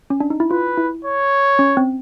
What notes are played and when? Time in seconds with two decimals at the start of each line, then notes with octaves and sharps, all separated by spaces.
0.10 C#4
0.20 D4
0.30 D#4
0.40 E4
0.51 F4 B4
0.77 E4
1.04 C#5
1.59 C#4
1.77 C4